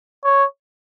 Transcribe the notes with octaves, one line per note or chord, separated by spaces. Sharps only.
C#5